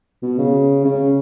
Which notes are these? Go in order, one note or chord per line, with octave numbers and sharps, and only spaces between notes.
B2
C#3
C#3